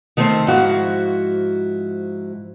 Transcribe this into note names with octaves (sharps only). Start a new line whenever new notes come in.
D#3 A3 C4 A#4 C5
G#2 F3 E4 F#4